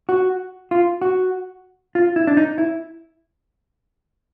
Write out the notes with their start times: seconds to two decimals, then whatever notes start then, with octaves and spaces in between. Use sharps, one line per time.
0.09 F#4
0.71 F4
1.02 F#4
1.95 F4
2.16 E4
2.27 D4
2.37 D#4
2.58 E4